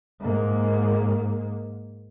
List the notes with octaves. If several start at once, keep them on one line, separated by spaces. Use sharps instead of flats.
G#2 A#3